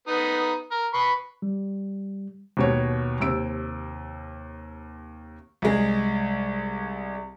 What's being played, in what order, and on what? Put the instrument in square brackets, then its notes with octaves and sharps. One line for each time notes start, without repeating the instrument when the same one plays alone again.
[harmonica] B3 D#4
A#4
B4 B5 C#6
[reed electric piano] G3
[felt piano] D#2 B2 C#5
D#2 C3 E6 D7
[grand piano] C2 G#3